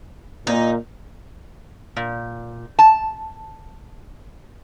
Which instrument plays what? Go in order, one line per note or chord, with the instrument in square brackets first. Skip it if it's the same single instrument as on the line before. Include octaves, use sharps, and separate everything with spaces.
[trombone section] A#2 [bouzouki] D#4
[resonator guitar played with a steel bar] A#2
A5